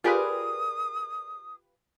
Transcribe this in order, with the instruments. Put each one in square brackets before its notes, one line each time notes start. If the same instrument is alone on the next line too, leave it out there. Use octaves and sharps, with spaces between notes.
[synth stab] F4 G4 B4 [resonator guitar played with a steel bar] G#4 A#4 D5 [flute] D#6